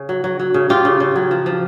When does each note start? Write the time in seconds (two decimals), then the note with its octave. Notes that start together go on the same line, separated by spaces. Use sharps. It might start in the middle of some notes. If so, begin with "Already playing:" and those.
Already playing: C#3
0.09 F#3
0.24 F#3
0.40 F#3
0.54 C#3
0.69 C#3 F4 G4
0.85 C#3
1.00 C#3
1.16 F#3
1.31 F3
1.46 F3